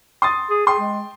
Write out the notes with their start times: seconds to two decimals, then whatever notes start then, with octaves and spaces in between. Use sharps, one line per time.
0.22 C6 D#6 A6
0.50 G#4
0.67 G#4 G5 C6
0.79 G#3